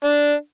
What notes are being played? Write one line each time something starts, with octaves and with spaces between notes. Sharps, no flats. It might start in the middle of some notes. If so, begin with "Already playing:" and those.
D4